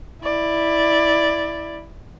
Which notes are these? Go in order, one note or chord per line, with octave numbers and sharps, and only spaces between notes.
E4 D5